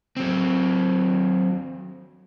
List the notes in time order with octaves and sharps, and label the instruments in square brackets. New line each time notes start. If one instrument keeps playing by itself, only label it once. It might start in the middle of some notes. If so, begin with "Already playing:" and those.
[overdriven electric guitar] F#3 C4